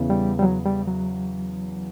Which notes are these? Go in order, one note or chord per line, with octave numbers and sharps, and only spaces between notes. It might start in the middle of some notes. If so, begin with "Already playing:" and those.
Already playing: E2 C#3 E3 B3 E4
G3
G3
F#3
G3
F#3